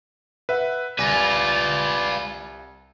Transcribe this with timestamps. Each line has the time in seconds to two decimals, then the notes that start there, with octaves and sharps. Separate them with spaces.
0.49 B4 E5 F#5
0.98 C2 F4 B4 D5 G#5 A#6